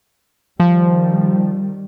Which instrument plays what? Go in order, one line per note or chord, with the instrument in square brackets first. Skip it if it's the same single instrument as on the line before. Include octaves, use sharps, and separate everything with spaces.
[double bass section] D#3 G3 [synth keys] F3